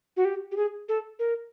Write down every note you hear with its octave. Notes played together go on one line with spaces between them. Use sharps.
F#4
G4
G4
G#4
A4
A#4